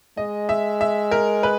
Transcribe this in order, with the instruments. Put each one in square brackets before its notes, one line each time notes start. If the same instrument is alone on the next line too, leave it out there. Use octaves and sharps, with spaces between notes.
[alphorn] G#3 [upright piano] D#5
[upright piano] E5
E5
A#4
B4